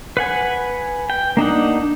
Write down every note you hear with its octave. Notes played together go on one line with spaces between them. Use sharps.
B4 F#5 G#5
G5
A#3 D4 D#4 F#5